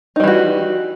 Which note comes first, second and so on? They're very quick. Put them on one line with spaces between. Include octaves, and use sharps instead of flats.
D#4 G3 E3 F#4